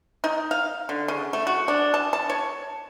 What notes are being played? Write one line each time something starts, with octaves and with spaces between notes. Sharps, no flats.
D#4
F5
D3
C#3
A3
F#4
D4
A5
A5
C#5